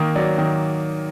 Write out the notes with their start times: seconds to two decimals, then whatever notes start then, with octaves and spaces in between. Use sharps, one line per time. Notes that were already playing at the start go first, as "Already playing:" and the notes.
Already playing: D#3 A#3
0.16 F#3 D5
0.38 D#3